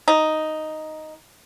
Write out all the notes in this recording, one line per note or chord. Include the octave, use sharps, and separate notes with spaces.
D#4